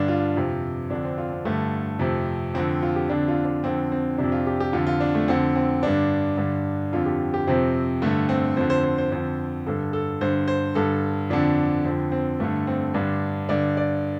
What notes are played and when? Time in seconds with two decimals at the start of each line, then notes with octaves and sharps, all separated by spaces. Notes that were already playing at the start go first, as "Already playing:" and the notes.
Already playing: G2 D3 D4
0.08 F4
0.36 F2 C3
0.90 F2 D3 D4
1.04 C4
1.18 F4
1.32 C4
1.45 G2 D3 A3
1.99 F2 C3
2.54 F2 D3 C4
2.82 F4
2.96 G4
3.09 F2 D3 D4
3.28 F4
3.45 D4
3.64 F2 D3 C4
3.92 C4
4.18 F2 C3 D4
4.32 F4
4.47 G4
4.60 G4
4.73 F2 D3 F4
4.87 F4
5.00 D4
5.15 A3
5.28 F2 D3 C4
5.56 C4
5.83 G2 D3 D4
6.37 G2 D3
6.93 F2 D3 F4
7.06 G4
7.34 G4
7.47 F2 C3 C4
8.02 G2 D3 A3
8.29 C4
8.57 F2 D3 C5
8.70 C5
8.84 C5
8.98 C5
9.12 F2 D3 C5
9.67 G2 D3 A4
9.93 A4
10.21 G2 D3 C5
10.48 C5
10.75 G2 D3 A4
11.30 F2 D3 D4
11.85 F2 D3 C4
12.12 C4
12.40 G2 D3 A3
12.67 C4
12.94 G2 D3 D4
13.49 G2 D3 D5
13.77 D5